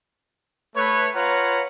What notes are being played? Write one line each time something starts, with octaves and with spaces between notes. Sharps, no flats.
A3 B4 C#5
F4 B4 C#5 F5 F#5 A#5